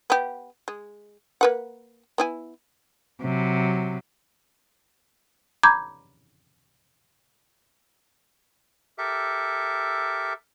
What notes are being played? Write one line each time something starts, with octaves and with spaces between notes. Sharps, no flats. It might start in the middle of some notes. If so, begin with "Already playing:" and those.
B3 G4
G#3
A#3 B4 F#5
B3 E4 G#5
C3 F#3
A#5 B5 D6 G6 G#6
G4 A4 A#4 E5